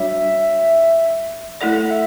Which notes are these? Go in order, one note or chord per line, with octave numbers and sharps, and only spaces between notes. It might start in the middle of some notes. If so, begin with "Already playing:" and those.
Already playing: G3 D4 F#4 C#5 E5
A3 E4 A4 D5 F#5
F#5
E5